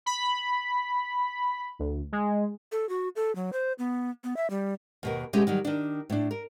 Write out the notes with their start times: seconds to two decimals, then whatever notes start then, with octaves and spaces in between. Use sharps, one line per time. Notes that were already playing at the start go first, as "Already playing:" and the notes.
0.06 B5
1.79 D2
2.12 G#3
2.72 A4
2.89 F#4
3.16 A4
3.35 F#3
3.53 C5
3.79 B3
4.24 B3
4.37 E5
4.50 G3
5.03 D#2 B2 A#4
5.33 B2 G#3 A3 C#4 G4
5.47 D#3 F#3 G3
5.65 D#3 D4
6.10 A2 D4
6.31 A#4